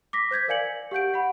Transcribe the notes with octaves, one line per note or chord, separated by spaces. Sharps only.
D6 A#6 B6
C5 G6 G#6 B6
A#4 D5 F5 G#5 C#7 F#7
G4 F#5 G6 D7
F#5 B5